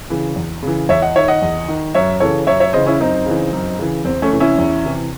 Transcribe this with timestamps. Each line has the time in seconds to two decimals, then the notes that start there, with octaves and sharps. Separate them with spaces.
0.10 C#3 E3
0.36 E2
0.63 C#3 E3
0.89 E2 C#5 E5
1.02 D#5 F#5
1.16 D#3 C#5 E5
1.28 D#5 F#5
1.42 E2
1.68 D#3
1.94 F#2 C#5 E5
2.20 C#3 E3 A4 C#5
2.47 F#2 C#5 E5
2.60 C#5 E5
2.73 C#3 E3 C5 D#5
2.86 C#4 E4
3.00 F#2 C4 D#4
3.26 C#3 E3
3.53 F#2
3.79 C#3 E3
4.05 E2 C4
4.22 A3 C#4
4.32 C3 E3
4.40 C#4 E4
4.58 E2
4.85 C3 E3